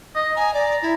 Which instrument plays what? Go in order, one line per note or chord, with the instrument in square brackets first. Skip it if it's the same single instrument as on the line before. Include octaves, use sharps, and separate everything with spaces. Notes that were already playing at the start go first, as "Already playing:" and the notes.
[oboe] D#5
[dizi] G#5 [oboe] A#5
[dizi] D5
E4